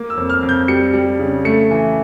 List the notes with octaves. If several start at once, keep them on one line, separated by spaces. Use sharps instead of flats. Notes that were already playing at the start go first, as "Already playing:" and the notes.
Already playing: A#3
E6
F2
F6
F2
G6
G3 C#7
G3
C#3
A3 C#7
E3